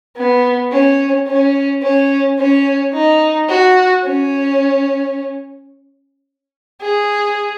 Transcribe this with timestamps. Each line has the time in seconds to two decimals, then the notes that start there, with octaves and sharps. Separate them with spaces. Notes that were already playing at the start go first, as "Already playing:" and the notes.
0.17 B3
0.72 C#4
1.27 C#4
1.82 C#4
2.39 C#4
2.94 D#4
3.49 F#4
4.05 C#4
6.82 G#4